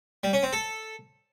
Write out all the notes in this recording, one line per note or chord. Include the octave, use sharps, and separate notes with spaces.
G3
C#4
C4
A4